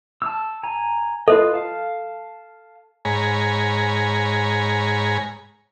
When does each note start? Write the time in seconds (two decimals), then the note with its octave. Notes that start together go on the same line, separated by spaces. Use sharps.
0.22 A5 E6
0.63 G#5 A#5
1.28 F4 A4 B4 D#5
1.54 F5 A5
3.05 G#2 C#5 G#5 A#5 B5